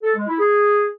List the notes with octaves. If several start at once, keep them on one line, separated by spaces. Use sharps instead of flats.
A4
G#3
E4
G#4